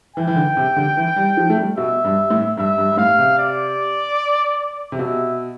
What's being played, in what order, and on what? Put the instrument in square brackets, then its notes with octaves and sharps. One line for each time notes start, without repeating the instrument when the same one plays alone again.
[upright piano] E3 [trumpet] G5
[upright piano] E3
D3
C3
D3
E3
G3
F3
A3
G3
[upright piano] B2 [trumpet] E5
[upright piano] G2
A2
[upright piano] G2 [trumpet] E5
[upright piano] G2
G2
[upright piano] A2 [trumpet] F5
[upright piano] C3
[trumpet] D5
[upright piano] C3
[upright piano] B2 [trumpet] E5